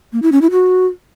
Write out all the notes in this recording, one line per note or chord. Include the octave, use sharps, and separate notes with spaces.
A#3
E4
C#4
E4
F#4